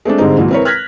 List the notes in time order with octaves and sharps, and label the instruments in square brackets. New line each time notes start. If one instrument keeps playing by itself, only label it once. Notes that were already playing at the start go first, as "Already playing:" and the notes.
[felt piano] G#3 A3 C4 D4
G#2 D3 G3 G#3 C4 D#4
C2 A#2 E3 F#3
C4 E4 A#4 B4 C#5
F6 F#6 G#6 A#6 B6